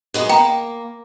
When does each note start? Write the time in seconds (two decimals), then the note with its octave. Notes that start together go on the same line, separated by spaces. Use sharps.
0.14 F#2 G#3 B3
0.29 A#3 G5 A#5